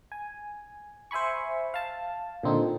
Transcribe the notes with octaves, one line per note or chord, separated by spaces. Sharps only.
G#5
C5 E5 G#5 B5 C#6
F5 A5
A#2 D3 C4 D#4